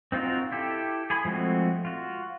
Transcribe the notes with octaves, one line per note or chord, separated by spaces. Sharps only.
C4 D#4 F4 F#4 A#4
E4 G4 A4
G#4 G#5 B5
F3 G#3 A3 C4 F#4
F4 F#4